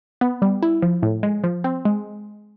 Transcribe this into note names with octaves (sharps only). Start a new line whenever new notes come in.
B3
G3
E4
F3
A2
G#3
F3
C4
G#3